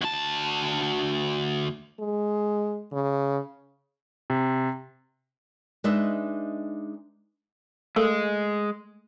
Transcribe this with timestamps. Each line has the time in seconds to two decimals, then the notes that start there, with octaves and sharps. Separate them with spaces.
0.02 D2 A5
2.00 G#3
2.92 C#3
4.30 C3
5.84 G#3 D4 D#4 B4 D#5 E5
7.96 G#3 A3 A4 A#4